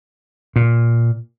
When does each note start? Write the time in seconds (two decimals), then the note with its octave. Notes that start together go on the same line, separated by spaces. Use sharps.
0.56 A#2